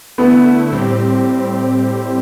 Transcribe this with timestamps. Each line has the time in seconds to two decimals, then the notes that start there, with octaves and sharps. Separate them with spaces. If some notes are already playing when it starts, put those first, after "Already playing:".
0.18 D3 A3 B3 E4
0.72 A2 G3 C4 G4